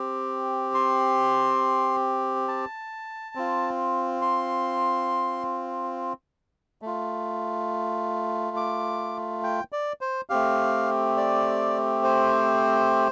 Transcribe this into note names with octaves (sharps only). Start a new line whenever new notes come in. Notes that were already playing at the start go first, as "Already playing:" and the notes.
Already playing: C4 G4
C6
A5
C4 F4
C6
A3 F4
D6
G5
D5
C5
A3 C4 G4 F5
D5
C5